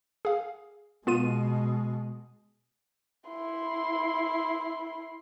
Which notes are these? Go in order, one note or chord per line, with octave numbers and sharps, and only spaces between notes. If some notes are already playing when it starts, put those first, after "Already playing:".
G#4 F5
B2 G#3 B3 F4 D#7
E4 C6